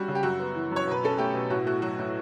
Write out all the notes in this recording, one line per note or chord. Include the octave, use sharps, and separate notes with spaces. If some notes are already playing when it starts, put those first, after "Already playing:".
Already playing: G3 C#4 F#4
C#3
G4
F#2 F#4
B3
E3
F#2
C#5
B2 B4
C#4 A4
A3 G4
B2
A2 F#4
A3 F#4
F#3 F#4
A2